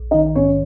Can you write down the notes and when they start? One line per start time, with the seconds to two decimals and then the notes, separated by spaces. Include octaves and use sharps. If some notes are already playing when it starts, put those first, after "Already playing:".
Already playing: A#1
0.11 D#4 D#5
0.14 D#3
0.35 G#2 C#4 C#5